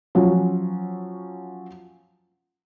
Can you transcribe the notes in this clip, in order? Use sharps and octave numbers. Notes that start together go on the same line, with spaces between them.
F3 F#3 C#4